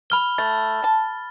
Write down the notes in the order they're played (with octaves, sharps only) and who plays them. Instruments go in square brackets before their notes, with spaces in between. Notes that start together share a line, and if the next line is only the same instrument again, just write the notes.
[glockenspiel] B5 F6 G7
[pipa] A3 [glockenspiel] A6
[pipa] A5